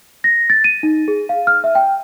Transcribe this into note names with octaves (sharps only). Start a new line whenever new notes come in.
A#6
A6
D#7
D#4
G#4
F5
F6
E5
G5